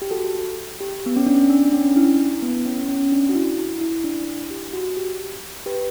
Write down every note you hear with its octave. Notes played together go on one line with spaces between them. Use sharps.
G4
F#4 A4
G4
B3
C#4
D4
D4
C#4
D4
E4
B3
C#4
C#4
D4
F#4
E4
E4
E4
D4
G4
F#4
G4
G4 B4